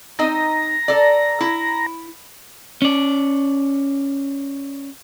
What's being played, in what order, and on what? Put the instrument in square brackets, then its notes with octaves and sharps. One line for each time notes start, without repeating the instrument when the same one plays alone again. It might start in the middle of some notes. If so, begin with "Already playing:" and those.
[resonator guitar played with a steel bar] C4 D#4 D#5 [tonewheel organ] A#5
[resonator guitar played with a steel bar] A4 D5
E4
[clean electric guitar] C#4 D5